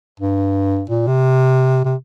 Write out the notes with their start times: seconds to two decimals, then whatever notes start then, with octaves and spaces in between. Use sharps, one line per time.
0.20 G2
0.90 A#2
1.07 C3
1.85 C3